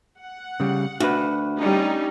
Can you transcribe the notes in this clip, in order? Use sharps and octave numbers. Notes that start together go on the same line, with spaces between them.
F#5
C#3 G3
D2 F#4 B4
G3 C#4 D#4